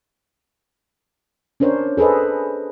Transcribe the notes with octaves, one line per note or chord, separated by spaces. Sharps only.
C#4 D4 A#4 C5 C#5
G#4 A4 B4 C5 D#5